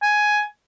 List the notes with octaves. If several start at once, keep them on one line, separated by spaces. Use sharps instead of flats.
G#5